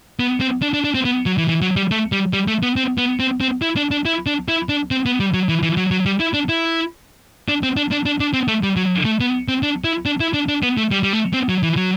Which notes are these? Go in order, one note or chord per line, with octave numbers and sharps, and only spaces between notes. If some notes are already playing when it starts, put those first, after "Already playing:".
B3
C4
D4
D4
D4
C4
B3
F#3
E3
E3
F#3
G3
A3
G3
G3
A3
B3
C4
B3
C4
C4
E4
D4
D4
E4
D4
E4
D4
C4
B3
G3
F#3
E3
E3
F#3
F#3
G3
E4
D4
E4
D4
C4
D4
D4
D4
D4
C4
A3
G3
F#3
A3
B3
C4
D4
E4
D4
E4
D4
D4
B3
A3
G3
G3
A3
C4
F#3
E3
F#3